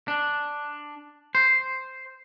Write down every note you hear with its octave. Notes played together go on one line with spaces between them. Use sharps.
D4
C5